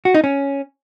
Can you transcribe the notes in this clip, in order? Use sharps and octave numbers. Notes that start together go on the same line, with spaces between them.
F#4
D#4
C#4